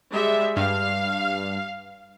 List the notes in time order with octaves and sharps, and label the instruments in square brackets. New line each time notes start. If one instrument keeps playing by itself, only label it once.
[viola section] G3 G#3 E5
[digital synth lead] G2 [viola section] F5